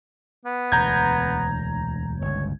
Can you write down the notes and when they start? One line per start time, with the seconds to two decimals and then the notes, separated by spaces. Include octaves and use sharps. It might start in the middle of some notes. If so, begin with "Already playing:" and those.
0.45 B3
0.72 E1 D2 A#5 G6 G#6
2.22 G1 C#2 C#5